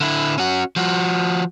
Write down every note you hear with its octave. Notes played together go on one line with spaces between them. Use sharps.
D3 E4
C#4 F#4
F3 F#4